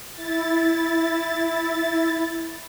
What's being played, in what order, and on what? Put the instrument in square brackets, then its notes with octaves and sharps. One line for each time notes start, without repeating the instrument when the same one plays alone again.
[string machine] E4 A6